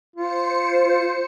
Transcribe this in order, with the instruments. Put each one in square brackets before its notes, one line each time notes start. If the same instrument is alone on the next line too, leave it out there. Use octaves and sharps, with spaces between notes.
[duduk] F4 [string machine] C5 C#7